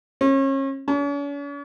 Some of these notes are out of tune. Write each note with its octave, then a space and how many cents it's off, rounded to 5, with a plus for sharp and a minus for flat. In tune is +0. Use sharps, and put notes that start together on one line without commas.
C#4 -35
C#4 +45